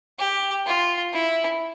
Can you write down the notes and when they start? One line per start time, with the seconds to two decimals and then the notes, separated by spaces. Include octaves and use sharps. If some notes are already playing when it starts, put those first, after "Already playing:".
0.19 G4
0.66 F4
1.13 E4